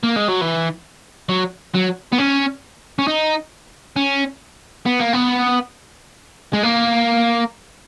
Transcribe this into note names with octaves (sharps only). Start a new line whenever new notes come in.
A#3
G#3
F#3
E3
F#3
F#3
B3
C#4
C#4
D#4
C#4
B3
A#3
B3
G#3
A#3